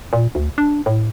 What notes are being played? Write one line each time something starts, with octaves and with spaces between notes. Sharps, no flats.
A#2
D2
D4
A2